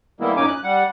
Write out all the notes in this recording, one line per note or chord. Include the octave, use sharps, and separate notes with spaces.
D#3 G3 G#3 A#3 B3 E4
F#2 A#2 C#4 D#4 G#5 D6
F#6
G3 F#5